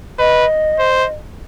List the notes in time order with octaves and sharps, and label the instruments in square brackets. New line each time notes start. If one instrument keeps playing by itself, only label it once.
[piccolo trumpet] B4 [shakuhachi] D#5
[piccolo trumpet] C5